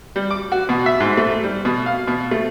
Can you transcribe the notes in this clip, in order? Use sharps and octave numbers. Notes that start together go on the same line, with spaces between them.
G3
D6
F#4
B2
E5
G#2
A3
G3
B2
F5
B2
A3